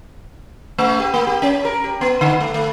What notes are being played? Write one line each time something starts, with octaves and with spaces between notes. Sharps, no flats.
A3
G4
A#3
G4
C#4
A#4
G4
B3
D3
A3
A3